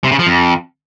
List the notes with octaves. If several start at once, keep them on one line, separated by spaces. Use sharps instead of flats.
C3
C#3
F3
F2